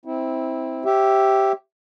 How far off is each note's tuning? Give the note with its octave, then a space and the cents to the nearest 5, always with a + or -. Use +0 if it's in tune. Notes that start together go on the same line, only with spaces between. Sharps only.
C4 +0 E4 -20
G4 -5 C#5 -40 E5 +0